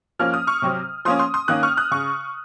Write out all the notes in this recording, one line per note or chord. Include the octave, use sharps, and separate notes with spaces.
F3 A#3 C#4 F6
D#6
C#6 F6
C3 F#3 C4
F3 A#3 C#4 C6 D#6
C6 D#6
C6 D#6
D#3 A#3 C#4 D#6 F#6
C#6 F6
D#6 F#6
C#3 C#6